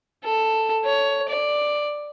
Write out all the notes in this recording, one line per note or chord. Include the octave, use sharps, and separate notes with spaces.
A4
C#5
D5